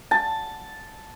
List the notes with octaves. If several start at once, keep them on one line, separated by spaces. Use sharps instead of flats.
A5